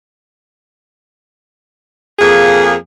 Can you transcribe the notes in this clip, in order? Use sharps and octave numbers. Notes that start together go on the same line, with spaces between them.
F2 A#3 G#4